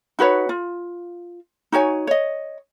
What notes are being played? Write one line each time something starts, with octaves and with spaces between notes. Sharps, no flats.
D#4 F#4 B4 C#5
F4
D#4 F#4 C#5 G#5
C#5 D#5